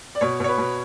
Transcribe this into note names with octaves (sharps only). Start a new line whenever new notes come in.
D5
B2 C#5
B2 C#5
B4
B2